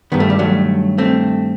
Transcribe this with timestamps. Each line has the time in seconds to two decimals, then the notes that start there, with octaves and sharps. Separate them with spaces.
0.12 G2 D#3 B3
0.20 A3
0.30 G3
0.39 F#3 A3
0.98 A3 C4